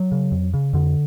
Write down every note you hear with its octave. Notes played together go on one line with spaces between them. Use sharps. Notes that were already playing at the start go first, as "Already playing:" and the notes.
Already playing: F#3
C#3
F2
C#3
F2 D3